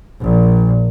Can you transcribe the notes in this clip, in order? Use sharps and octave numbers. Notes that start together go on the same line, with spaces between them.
A#1 A#2